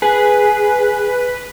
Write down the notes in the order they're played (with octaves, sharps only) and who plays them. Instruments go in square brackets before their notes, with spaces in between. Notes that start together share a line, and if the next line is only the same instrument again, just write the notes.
[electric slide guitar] G#4 [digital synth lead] B4